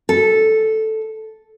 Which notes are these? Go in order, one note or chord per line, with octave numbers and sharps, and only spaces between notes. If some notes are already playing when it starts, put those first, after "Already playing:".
A4